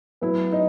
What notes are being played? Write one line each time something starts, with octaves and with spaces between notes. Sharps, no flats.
A2 F#3 B3 E4
D#4